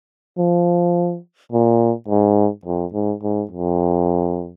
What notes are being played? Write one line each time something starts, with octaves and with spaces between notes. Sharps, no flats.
F3
A#2
G#2
F2
G#2
G#2
F2